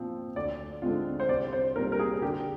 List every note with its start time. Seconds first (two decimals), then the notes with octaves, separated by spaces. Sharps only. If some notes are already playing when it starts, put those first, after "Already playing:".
Already playing: A#2 F3 C4
0.36 D2 D5
0.82 D3 G#3 C4 F4
1.20 C5
1.29 C2 D5
1.53 C5
1.76 A#2 G3 C4 A#4
1.92 A#4
1.99 G#4
2.22 D3 G4